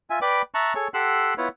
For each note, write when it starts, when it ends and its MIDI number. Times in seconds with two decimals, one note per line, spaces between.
0.10 0.19 65
0.10 0.19 76
0.10 0.19 80
0.22 0.42 71
0.22 0.42 74
0.22 0.42 79
0.22 0.42 83
0.22 0.42 86
0.54 0.73 76
0.54 0.73 81
0.54 0.73 82
0.54 0.73 85
0.54 0.73 90
0.75 0.88 68
0.75 0.88 69
0.75 0.88 73
0.75 0.88 85
0.94 1.34 67
0.94 1.34 69
0.94 1.34 78
0.94 1.34 84
0.94 1.34 88
0.94 1.34 90
1.38 1.48 59
1.38 1.48 64
1.38 1.48 65
1.38 1.48 71
1.38 1.48 73